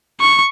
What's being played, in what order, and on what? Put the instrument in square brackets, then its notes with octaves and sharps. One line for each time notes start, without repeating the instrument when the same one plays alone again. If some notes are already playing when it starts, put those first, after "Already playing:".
[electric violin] C#6